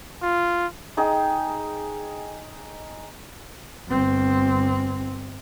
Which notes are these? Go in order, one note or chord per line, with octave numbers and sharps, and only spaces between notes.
F4
D#4 G#4 D#5 G5
G1 C4